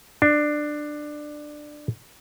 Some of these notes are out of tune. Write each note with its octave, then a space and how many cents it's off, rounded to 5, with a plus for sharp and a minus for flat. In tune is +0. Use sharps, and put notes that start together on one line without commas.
D4 +15